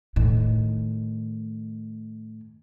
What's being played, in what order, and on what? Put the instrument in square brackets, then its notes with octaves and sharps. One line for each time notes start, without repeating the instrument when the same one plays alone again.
[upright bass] A2 D#3